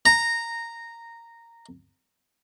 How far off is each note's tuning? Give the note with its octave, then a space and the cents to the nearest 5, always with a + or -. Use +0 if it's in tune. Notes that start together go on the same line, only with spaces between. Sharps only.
A#5 -10